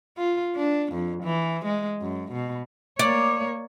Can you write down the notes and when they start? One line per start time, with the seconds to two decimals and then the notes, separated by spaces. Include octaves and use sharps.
0.17 F4
0.56 D4
0.93 F2
1.24 E3
1.65 G#3
2.01 F#2
2.32 B2
2.99 A#3 C#5 D5